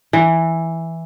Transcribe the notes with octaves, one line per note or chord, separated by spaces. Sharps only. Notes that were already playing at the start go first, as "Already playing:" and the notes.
E3